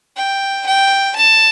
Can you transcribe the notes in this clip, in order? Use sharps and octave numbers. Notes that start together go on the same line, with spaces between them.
G5
G5
A5